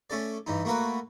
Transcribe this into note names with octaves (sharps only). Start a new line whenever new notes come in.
A3 C#4 A4 D5
G2 E3 D#4
A3 A#3 F#4 A#4 B4